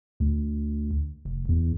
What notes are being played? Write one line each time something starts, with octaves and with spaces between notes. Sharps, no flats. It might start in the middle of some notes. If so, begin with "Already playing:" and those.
D2
F1
E2